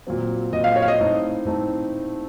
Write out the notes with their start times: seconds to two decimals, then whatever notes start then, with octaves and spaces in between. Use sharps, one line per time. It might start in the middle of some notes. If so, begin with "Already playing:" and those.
0.07 A#2 F#3 C4
0.52 A#2 F#3 C4 D#5
0.64 F5
0.76 C#5
0.82 F5
0.88 D#5
0.99 A2 A3 C4 D#4
1.45 A2 A3 C4 D#4